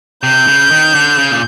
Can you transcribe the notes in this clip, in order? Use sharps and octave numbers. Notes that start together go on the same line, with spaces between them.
C3 G6
C#3
D#3
D3
C#3
A#2